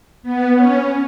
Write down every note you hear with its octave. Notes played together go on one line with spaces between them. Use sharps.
B3
C#4